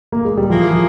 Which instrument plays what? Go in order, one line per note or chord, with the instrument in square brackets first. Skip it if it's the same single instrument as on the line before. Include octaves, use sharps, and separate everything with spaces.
[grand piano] A#3
G#3
G3
[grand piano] F3 [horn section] A#3 E4 G#4
[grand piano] F3